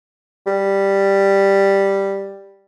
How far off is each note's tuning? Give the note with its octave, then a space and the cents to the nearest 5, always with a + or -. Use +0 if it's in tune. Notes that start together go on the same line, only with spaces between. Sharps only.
G3 +5